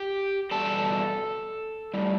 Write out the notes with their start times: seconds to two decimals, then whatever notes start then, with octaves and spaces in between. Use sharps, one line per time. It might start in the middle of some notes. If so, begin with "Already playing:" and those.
Already playing: G4 G5
0.51 E2 B2 G3 A4 A5
1.94 A2 G3